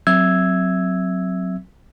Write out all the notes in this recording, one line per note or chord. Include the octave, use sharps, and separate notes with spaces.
F#3 C4 E5 E6 G#6